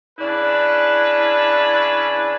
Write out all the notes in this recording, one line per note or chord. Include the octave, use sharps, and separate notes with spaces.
C#3 D4 E4 B4